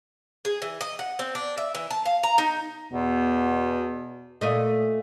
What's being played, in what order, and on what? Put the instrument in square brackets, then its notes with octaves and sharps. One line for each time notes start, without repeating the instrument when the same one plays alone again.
[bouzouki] G#4
E3
D#5
F#5
C4
D4
E5
E3
A5
F5
A#5
D#4
[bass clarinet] E2 [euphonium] B2
[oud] A#2 A3 D#5